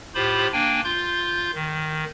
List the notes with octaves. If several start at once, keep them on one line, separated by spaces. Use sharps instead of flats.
A2 F4 G4 C5 B5
A#3 D4 G5 G#5
F4 C6 G6
D#3